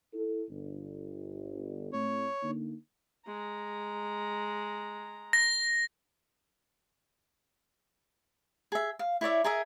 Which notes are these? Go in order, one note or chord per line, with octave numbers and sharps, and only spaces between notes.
E4 A4
G1
A2 A3 C4 C#5
D3 A#3 D#4
G#3 A#5
A#6
G#4 E5
F5
E4 C#5 D5 E5
G#4 A#4 D#5 E5